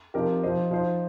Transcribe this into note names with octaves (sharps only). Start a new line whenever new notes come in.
C3 F3 D#4 G4 A#4
F3 D#4 C5 D#5
F3 D#4 C5 D#5